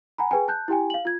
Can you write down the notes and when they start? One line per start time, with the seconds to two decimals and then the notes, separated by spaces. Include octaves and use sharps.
0.18 F#5 G#5 A#5 B5
0.31 G#4 B4 G5 G#5
0.48 A5 F#6 G6
0.68 E4 G4 G5 G#5
0.90 F5 F#7
1.05 F4 G#6